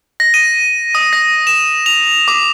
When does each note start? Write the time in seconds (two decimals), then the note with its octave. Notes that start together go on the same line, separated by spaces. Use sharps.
0.20 A#6
0.34 D#7
0.95 D#6
1.13 A#6
1.47 E7
1.86 F7
2.28 D6